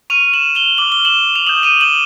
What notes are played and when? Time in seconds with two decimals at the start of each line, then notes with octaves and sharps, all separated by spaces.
0.10 C#6 F6 D#7 F7
0.33 E7 F#7
0.55 F7 G7
0.78 D6 F6 F#7
0.92 G7
1.05 E7 F#7
1.36 F7
1.47 D#6 G6 E7 F#7
1.63 D#7 F7
1.80 E7 F#7